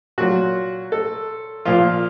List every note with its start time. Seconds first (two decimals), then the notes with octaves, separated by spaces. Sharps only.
0.18 A#2 F#3 F#4
0.92 A4
1.65 A#2 F3 F4